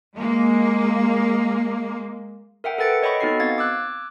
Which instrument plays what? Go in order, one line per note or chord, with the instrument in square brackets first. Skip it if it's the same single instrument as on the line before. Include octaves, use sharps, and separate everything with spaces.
[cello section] G#3 A#3
[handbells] A#4 E5 F#5 G5
A4 B4 F#5 A6 C#7 D7
C#5 D#5 G5 B5 C#6
B3 D#4 F#4 A4 D#5 C7
C4 F5 G#6 A6
D6 E6 F#6 G#6